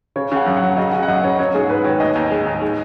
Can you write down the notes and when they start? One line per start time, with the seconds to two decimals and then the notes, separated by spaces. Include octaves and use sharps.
0.16 C#3 C#5
0.32 C#3 F#5
0.46 F#2
0.57 F#5
0.62 F#3
0.77 C#3 D#5
0.92 C#3 F#5
1.03 F#5
1.08 F#2 D#5
1.24 C#3 C#5
1.39 F#3 C#5
1.54 G#2 G#4
1.69 G#2 B4
1.84 D#3 C#5
2.00 D#2 D#5
2.15 D#2
2.31 G#3
2.46 D#2
2.61 G#3